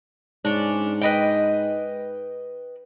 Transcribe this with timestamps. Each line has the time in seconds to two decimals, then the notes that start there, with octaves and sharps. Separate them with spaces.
0.45 G#2 C#4 D4
1.01 B4 D#5 G5